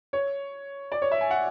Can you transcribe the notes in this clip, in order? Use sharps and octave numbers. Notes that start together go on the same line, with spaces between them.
C#5
D5
C#5
E5
G#5
F#5